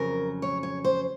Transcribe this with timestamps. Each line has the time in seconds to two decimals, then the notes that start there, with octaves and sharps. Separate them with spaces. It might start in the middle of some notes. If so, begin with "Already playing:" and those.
Already playing: F2 C#3 F#3 A#4
0.42 C#5
0.63 C#5
0.85 C5